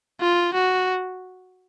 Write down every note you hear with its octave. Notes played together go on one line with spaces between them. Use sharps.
F4
F#4